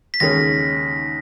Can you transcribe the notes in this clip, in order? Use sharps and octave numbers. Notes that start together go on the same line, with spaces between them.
B6
D#2 C#3 G#3 C#4 G#4 A#6